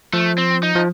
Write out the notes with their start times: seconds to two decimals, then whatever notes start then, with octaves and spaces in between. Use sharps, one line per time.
0.13 F3 A3
0.38 C4
0.63 D#4
0.75 F3